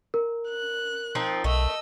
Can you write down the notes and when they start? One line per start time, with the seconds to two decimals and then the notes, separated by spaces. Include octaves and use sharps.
0.14 A#4
0.48 F#6
1.15 F3 C4 D#4
1.44 B1 A3 D#5 E6